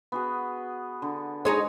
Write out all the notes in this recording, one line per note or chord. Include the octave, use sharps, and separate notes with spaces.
B3 F#4 G#4
D3
G#3 D#4 G#4 C#5